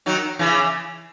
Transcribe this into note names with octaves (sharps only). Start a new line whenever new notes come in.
D#3 F#3
C#3 E3